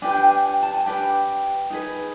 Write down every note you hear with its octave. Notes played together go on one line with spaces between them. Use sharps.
D4 G4 B4 G#5
G5
G#5
A5
G#5
D4 G4 B4 G5
D#4 G#4 B4